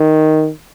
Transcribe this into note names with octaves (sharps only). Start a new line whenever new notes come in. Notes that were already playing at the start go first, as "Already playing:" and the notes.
Already playing: D#3